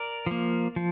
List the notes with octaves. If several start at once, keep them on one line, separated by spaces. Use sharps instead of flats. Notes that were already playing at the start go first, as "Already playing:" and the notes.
Already playing: A#4 D5
F3 A#3
F3